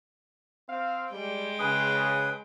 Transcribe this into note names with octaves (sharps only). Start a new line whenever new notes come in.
C4 F5
G3 G#3 G5
C#3 G#4 B4 D#6